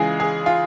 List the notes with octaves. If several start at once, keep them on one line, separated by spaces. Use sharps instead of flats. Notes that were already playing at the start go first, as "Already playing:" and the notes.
Already playing: C#3 E3 G#3 F4 G#4
G#4
F4